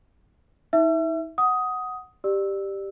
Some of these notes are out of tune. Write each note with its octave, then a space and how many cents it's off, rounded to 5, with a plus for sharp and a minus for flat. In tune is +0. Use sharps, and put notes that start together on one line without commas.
D#4 +45 E5 +0 E6 +45
F#5 +0 D#6 +10
G4 +0 D5 +20 E6 -10